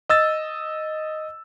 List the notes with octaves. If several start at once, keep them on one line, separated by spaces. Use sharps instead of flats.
D#5 E6 A6